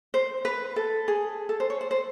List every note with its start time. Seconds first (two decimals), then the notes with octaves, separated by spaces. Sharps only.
0.14 C5
0.45 B4
0.76 A4
1.08 G#4
1.49 A4
1.60 C5
1.70 C#5
1.81 C5
1.91 C5